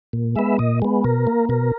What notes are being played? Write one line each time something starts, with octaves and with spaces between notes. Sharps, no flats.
A#2
G#3 B3 E5
A#2 D#5
G#3 B3
B2 A#4
A#3
B2 A#4